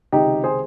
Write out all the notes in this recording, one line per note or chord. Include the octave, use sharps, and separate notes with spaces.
C#2 C3 D#3 D#4 G4
G#4 C5